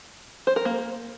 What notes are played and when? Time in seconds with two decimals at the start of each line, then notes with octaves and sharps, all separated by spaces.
0.47 C5
0.56 A#4
0.65 A#3